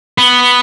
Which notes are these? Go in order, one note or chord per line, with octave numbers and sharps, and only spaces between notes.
B3